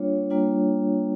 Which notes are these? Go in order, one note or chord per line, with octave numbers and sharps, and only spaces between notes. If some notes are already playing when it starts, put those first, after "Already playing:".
Already playing: G3 A#3 D4 F4 C#5
G3 A#3 D4 F4